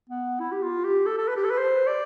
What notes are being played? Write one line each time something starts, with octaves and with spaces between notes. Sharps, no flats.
B3
E4
G4
F4
G4
A4
A4
B4
G4
A4
B4
C5
D5